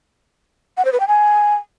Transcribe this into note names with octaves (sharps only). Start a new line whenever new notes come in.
F#5
C5
B4
G5
G#5